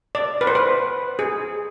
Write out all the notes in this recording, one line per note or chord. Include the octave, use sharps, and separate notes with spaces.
D5
B4
C5
B4
G#4